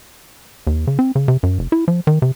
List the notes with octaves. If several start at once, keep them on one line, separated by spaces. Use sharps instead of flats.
D#2
C#3
C4
C#3
C3
F#2
F1
E4
F3
D#3
C3